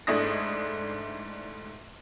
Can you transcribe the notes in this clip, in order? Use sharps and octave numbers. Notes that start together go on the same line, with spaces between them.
G#2 A3 D4 E4 D#6 A#6